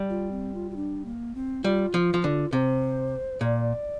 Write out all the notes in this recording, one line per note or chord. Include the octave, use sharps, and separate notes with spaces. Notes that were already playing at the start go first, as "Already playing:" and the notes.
Already playing: G3
F4
C4
F4
F4
D4
A#3
C4
G3 F4
F3
F3
D3
C3 C5
A#2 D5